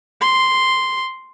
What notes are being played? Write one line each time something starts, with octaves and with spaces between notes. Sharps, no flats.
C6